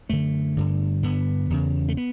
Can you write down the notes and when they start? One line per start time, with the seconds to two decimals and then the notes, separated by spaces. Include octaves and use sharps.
0.09 F#2 D3 A3
0.57 G2 D3
1.03 G2 D3 B3
1.50 E2 C#3
1.89 A3
1.97 B3